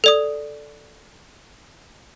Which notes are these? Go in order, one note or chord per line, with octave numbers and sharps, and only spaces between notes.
A4 D5 D#6